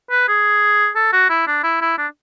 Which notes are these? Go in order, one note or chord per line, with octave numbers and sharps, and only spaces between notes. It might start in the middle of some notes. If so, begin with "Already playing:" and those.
B4
G#4
A4
F#4
E4
D4
E4
E4
D4